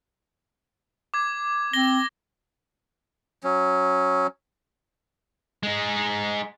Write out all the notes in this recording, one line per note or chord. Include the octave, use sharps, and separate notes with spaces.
D6 G#6
C4 A#6 G7
F#3 C#4
G#3 D#4